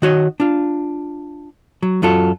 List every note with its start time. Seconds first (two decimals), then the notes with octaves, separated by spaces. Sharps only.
0.02 D#3 F#4 C#5 D#5
0.40 D4 F4
1.83 F#3
2.02 F#2 F#3 F4 A4